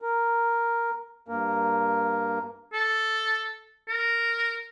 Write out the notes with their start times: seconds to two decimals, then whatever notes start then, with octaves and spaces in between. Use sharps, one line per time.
0.02 A#4
1.28 G2 A#3 A#4
2.73 A4
3.88 A#4